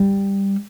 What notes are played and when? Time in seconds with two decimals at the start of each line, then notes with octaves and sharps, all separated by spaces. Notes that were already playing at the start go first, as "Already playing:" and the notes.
Already playing: G3